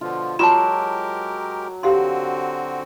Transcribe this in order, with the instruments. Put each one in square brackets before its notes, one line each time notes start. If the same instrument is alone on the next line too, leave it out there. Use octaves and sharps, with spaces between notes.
[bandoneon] B2 D3 F3 [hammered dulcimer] F4
[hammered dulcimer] F#3 [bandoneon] G#3 G4 A#4 [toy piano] F4 C6 [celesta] A5 E7
[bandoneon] D3 C4 F#4 [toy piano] G4 F5 C6